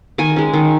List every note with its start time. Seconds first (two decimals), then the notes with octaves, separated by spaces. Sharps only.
0.18 D#3 G#5
0.36 G#3 C#4
0.54 D#3